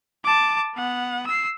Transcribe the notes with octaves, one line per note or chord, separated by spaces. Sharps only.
A5 D6
B3 F#5
E6 C7